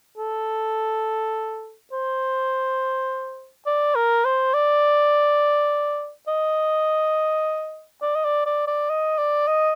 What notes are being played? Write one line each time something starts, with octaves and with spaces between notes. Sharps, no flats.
A4
C5
D5
A#4
C5
D5
D#5
D5
D#5
D5
D5
D5
D#5
D5
D#5